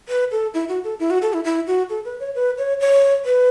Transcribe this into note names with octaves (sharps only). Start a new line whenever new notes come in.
B4
A4
E4
F#4
A4
E4
F#4
A4
E4
E4
F#4
A4
B4
C#5
B4
C#5
C#5
B4